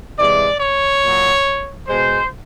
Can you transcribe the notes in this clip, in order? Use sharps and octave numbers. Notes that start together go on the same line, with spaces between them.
C3 E3 G#3 D5
C#5
A#2 F#3
B2 G#3 C5